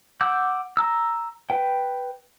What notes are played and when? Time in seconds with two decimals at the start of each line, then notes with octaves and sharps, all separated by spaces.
0.21 F#5 D6 E6 G6
0.77 A#5 E6
1.50 B4 G5